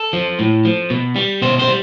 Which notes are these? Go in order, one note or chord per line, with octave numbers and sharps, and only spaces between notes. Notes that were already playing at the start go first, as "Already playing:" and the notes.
Already playing: A4
F3
A2
F3
B2
G3
B2 C5
C5
G3